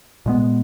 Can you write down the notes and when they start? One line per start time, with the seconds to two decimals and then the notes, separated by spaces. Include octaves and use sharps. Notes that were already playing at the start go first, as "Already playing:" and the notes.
0.26 A#2 G#3 B3